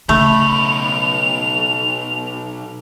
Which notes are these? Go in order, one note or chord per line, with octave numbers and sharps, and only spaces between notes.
B1 C#3 A3 B5 F7